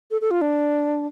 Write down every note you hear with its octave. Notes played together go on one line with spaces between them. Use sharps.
A4
A4
F4
D4